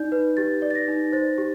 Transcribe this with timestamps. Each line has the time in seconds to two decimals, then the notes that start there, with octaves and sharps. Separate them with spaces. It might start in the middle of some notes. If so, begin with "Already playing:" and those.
Already playing: D#4 D5 G6
0.12 B4
0.37 G4 A6
0.62 D5
0.70 A6
0.75 A#6
0.88 D#4
1.13 C5 A6
1.38 G4